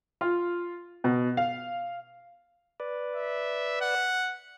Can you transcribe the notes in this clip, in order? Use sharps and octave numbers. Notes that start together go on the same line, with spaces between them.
F4
B2
F5
B4 D5
E5
F#5